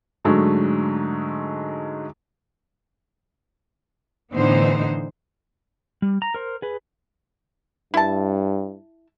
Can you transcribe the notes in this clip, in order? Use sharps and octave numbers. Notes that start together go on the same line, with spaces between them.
G#2 D3 F#3 G#3 A3
A2 D3 E3 B3 D#4 C5
G3
A#5
A#4 C5
G#4 B4
G2 E4 A5